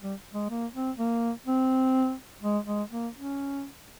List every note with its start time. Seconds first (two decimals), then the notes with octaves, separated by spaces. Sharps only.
0.03 G3
0.34 G#3
0.50 A#3
0.74 C4
0.98 A#3
1.46 C4
2.42 G#3
2.66 G#3
2.91 A#3
3.15 C#4